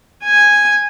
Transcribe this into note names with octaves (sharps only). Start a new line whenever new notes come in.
G#5